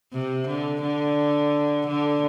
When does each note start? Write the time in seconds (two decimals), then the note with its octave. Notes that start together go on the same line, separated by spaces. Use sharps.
0.13 C3
0.47 D3
0.82 D3
1.86 D3